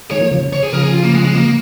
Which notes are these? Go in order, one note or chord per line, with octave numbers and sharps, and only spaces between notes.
D#3 G#3 C#5
F3 A#3
C#3 F3
C#3
C#5
G#4
C#3 F3 A#4
G#4
F4
A#3
G#3
G#3
A#3